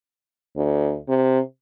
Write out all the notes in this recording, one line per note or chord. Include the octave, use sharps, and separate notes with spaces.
D2
C3